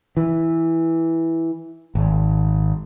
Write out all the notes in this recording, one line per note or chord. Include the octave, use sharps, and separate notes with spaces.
E3
G#1